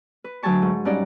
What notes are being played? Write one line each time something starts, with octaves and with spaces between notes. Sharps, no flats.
B4
D2 F#3 G#5 A5 C#6
G#2
G2 C#4 D#4 D5 F#5 A#5